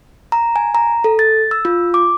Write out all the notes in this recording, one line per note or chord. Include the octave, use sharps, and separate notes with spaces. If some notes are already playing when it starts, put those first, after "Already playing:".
A#5
G#5
A#5
A4
A6
E6
F4
D6